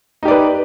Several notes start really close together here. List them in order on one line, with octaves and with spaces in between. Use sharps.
D#4 G4 D5 B4